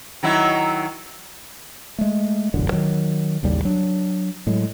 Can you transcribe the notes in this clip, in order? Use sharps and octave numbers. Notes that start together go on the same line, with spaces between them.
D#3 F#3 E4
G#3 A3
E1 A1 F#2 D3
D#3 F#3
A1 D#2 C#3 G3
F#3 D4
A2 F#3 G#3